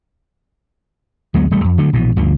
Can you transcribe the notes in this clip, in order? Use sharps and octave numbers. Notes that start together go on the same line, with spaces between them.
D2 F#3 G#3 B3
D#1 G3 A3
F2
D2 D3 F#3 A3
A#1 B2 E3
G1 D2 D3 F3